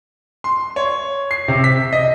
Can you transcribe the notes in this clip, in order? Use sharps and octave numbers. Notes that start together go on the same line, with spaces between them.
C6
C#5
C7
C3
B6
D#5